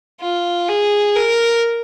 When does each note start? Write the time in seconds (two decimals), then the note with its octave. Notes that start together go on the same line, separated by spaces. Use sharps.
0.21 F4
0.68 G#4
1.16 A#4